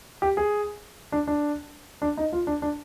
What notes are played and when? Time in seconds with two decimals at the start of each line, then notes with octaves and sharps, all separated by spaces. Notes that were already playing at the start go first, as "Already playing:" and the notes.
0.22 G4
0.37 G#4
1.12 D4
1.27 D4
2.02 D4
2.17 D#4
2.33 F4
2.47 D4
2.62 D4